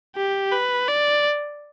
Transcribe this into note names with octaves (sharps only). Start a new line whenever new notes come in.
G4
B4
D5